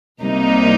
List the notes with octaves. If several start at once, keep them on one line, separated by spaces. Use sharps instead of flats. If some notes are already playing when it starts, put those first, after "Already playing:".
C2 C3 G3 A#3 D#4